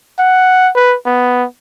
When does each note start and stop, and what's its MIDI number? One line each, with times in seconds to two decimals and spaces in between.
0.19 0.70 78
0.75 0.96 71
1.06 1.45 59